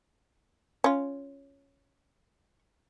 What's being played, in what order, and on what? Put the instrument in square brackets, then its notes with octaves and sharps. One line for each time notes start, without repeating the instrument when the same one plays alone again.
[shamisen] C#4 F4